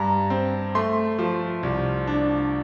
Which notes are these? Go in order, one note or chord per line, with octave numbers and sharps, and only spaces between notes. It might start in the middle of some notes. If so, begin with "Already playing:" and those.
Already playing: G2 A#5
C4
A3 C6
F3
C2
D4